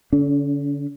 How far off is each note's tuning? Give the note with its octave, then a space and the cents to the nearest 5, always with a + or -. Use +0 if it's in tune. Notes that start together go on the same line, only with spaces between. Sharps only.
D3 -30 C#4 +35